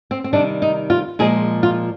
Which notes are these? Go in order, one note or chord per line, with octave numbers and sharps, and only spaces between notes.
C4
C4
C3 D#3 G3 D4
D#4
F4
A#2 F3 G#3 G#4
F4